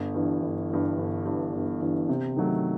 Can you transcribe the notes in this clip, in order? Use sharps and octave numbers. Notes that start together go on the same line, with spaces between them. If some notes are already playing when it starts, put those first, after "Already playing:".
Already playing: G1
G2 E3
G1
G2 E3
G1
G2 E3
G1
G2 E3
C3
D#3 F#3 A3